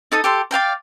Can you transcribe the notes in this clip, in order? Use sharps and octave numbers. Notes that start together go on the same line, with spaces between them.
D#4 A4 D#6
G4 A4 C6
D5 F5 G5 A#5